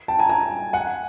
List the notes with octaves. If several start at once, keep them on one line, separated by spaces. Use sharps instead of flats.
G5 A5
G#5 A#5
G#5 A#5
F#5 G#5